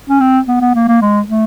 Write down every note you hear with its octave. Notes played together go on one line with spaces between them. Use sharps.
C#4
C4
B3
B3
A#3
A#3
G#3
A3